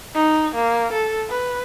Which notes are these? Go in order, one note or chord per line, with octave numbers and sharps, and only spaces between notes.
D#4
A#3
A4
B4